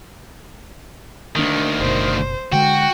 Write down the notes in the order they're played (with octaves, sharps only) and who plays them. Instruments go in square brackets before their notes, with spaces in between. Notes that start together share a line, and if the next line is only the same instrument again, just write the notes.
[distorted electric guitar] D2 D#3 [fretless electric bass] A#3 D4
[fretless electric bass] F#1 B2 [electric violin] C5
[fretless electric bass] D3 G#3 [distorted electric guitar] F#4 [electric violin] G5